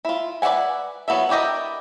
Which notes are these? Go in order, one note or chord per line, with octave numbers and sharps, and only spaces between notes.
E4 F4
B4 D5 E5 F#5 G#5
F#3 B3 E4 A4 E5
D4 E4 G4 A#4 D#5